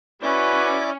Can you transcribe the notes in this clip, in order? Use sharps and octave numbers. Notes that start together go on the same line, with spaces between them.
C#4 E4 F#4 B4 D5 D6